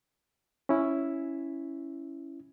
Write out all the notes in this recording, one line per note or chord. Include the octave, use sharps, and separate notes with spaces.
C#4 E4